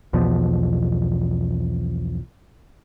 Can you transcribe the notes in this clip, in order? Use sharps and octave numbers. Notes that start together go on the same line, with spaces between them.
B1 E2 B2 F3